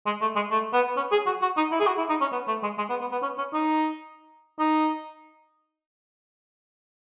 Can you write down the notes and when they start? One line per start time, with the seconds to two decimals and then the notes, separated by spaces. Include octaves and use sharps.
0.06 G#3
0.21 A3
0.36 G#3
0.51 A3
0.73 B3
0.97 C#4
1.12 G#4
1.26 F#4
1.42 F#4
1.57 D#4
1.72 E4
1.80 G#4
1.87 F#4
1.98 E4
2.10 D#4
2.21 C#4
2.32 B3
2.48 A3
2.63 G#3
2.78 G#3
2.89 B3
3.01 B3
3.12 B3
3.23 C#4
3.38 C#4
3.53 D#4
4.59 D#4